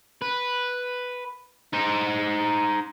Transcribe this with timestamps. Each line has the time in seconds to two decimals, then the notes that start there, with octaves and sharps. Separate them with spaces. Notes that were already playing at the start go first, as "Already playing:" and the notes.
0.22 B4
1.73 D#4 C5